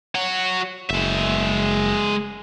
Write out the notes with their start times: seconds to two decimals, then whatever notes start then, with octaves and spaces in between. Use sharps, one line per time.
0.15 F#4 C#5
0.90 F#1 G#3 E5